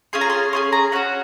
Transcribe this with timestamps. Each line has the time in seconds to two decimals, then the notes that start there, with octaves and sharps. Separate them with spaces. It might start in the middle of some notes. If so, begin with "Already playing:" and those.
0.13 C#4 F4 G#4 C6
0.21 A#5
0.30 C6
0.53 C#4 F4 G#4 C6
0.72 A#5
0.92 C#4 F#4 F#5